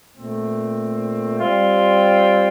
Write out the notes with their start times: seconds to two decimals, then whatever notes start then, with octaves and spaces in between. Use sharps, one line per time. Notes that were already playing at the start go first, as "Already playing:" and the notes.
0.14 A#2 A3 C4
1.38 G3 C4 F4